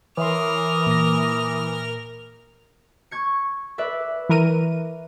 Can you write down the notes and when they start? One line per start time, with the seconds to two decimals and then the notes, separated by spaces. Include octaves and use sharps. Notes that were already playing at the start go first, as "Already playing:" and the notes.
0.17 E3 A#4 C#5 E5 C6 D6 D#6 F6
0.87 A#2 A#6
3.11 C#6 G#6 C#7
3.78 B4 D5 E5
4.29 E3 A#4 D#7